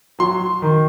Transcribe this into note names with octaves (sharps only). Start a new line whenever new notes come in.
F#3 C6
D#3